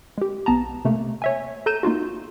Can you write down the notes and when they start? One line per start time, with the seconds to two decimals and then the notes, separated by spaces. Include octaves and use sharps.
0.18 G#3 G4
0.46 B1 B3 A5 A#5
0.85 C3 A3 A#3
1.22 C#5 E5 G#5
1.66 A4 A#5 G6 D#7 E7
1.83 A#3 D#4 F4 F#4